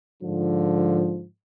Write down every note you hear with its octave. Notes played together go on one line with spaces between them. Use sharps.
G#2 D3 F3